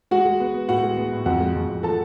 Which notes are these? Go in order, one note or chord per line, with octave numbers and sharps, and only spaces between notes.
G#3 F#4 F#5
G#3
B3
B3
A2 F#4 F#5
G#3
B3
A2
F2 F#4 F#5
G#3
F2
F2
F3 A4 A5